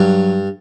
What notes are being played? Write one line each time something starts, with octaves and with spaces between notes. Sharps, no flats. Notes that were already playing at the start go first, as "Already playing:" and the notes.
Already playing: G2 F#3